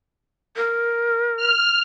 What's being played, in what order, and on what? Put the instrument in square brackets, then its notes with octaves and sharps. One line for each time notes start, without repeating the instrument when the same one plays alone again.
[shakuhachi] A#4
[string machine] F6